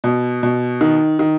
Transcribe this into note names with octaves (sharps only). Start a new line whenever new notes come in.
B2
B2
D#3
D#3